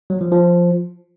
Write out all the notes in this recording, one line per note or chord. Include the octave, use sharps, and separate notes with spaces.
F#3
F3
F3